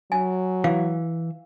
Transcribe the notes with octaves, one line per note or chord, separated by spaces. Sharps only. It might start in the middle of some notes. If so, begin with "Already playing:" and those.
F#3 G#5
E3 F5